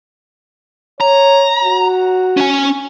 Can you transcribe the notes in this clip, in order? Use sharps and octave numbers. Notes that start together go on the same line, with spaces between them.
C#5 A#5
F#4
C#4 G#5